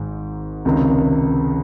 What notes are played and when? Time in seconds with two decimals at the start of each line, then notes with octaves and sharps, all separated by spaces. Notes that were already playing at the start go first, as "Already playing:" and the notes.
Already playing: G#1 G#2 D#3
0.65 C#2 C3 D#3